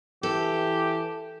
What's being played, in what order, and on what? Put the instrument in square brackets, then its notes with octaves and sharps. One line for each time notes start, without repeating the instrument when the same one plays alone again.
[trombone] E3 [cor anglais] G4 [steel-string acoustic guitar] A4